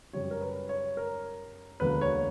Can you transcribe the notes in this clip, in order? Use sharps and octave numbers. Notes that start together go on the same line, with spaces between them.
F#2 C#3 G3 C#4 C#5
A#4
B4
C#5
A#4
E1 D2 D3 A#3 B4
C#5